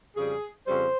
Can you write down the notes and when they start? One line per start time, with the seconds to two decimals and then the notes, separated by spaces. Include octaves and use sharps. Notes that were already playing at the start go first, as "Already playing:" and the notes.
0.15 F2 C#3 G3 G#4
0.66 F2 C#3 G3 C5